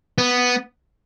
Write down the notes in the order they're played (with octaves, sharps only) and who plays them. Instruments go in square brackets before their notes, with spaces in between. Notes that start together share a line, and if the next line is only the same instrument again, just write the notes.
[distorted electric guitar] B3